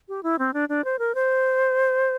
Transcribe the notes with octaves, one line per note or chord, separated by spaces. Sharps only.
G4
E4
C4
D4
D4
C5
A#4
C5